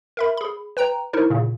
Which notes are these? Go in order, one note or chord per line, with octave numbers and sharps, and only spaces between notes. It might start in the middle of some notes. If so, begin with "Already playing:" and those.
A#4 E5 B5
G#4 B5
B4 G5 A#5
D#4 E4 A#4 C5
A#2 C#3